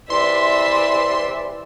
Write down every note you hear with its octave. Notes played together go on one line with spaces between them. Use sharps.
E2 C3 E3 D5 E5 C6